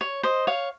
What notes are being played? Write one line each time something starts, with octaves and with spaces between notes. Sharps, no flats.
C#5
C5 D#5
C#5 F5